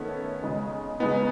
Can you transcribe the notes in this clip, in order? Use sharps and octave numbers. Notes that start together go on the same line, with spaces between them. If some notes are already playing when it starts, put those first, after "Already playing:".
Already playing: D#3 A3 B3 C#4
C#3 G#3 D#4
C#3 G#3 B3 D#4